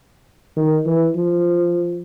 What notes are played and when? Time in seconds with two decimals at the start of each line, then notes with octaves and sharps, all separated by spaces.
0.57 D#3
0.86 E3
1.16 F3